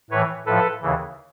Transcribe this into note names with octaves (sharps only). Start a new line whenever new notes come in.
A2 E3 B4 C#5
A2 F3 A4 B4
D#2 C#3 E3